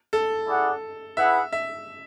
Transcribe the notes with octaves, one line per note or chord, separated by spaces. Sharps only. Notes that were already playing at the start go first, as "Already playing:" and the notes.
A4
E4 G#4 D5 F#5
E4 G#4 B4 E5 F#5
E5